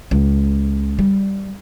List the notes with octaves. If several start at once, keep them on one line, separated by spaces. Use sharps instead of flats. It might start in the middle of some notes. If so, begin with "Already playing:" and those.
C#2
G3